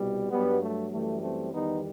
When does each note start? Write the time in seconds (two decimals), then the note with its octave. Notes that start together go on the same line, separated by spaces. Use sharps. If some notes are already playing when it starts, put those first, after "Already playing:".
Already playing: C2 B2 G3
0.31 G2 F#3 G3 B3
0.61 A3
0.92 F#2 E3 G3 A3
1.22 A3 C4
1.53 E2 D#3 G3 B3 D#4